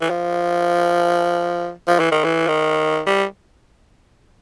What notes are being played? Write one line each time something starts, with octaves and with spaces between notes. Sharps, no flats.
E3
F3
F3
E3
D#3
E3
D#3
G3